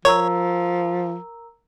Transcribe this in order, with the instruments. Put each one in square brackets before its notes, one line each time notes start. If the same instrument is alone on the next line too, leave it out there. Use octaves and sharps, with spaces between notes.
[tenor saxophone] F3 [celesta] A#4 A#5 E6 [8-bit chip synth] C#5